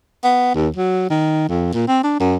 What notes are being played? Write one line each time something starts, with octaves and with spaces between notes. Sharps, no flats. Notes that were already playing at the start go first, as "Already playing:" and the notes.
B3
D#2
F#3
D#3
F2
A#2
C4
D4
F#2